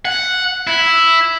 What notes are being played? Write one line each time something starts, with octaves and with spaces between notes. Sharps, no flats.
F#5
E4